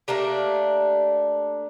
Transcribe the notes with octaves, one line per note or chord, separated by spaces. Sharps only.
A3 A#3 D4 G4